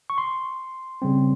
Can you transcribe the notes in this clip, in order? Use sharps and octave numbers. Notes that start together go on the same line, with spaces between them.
C#6
C6
C#3 G3 C4